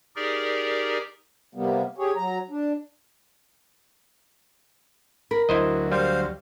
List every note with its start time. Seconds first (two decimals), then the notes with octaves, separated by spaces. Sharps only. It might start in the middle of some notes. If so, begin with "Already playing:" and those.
0.16 D#4 G4 G#4 A#4 D5
1.55 C3 G3 A#3 B3
1.98 G4 G#4 C#5
2.16 F#3 A#5
2.50 D4
5.31 A#4 B5
5.49 D2 F#3 E4 C5 D#5
5.92 G3 C5 F5